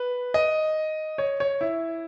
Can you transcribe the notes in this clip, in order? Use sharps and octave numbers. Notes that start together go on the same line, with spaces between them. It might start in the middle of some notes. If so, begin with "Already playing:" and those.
Already playing: B4
D#5
C#5
C#5
E4